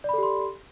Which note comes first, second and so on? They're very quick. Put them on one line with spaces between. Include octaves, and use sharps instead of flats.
D5 B5 A4 G4 C6